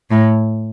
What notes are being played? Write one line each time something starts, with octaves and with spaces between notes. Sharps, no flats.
A2